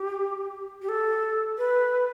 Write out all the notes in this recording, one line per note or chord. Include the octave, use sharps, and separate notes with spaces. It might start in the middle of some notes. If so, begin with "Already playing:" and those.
Already playing: G4
G4
A4
B4